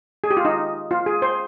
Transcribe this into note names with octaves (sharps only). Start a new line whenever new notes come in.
G#4
G4
F4
D#4
F4
G#4
C5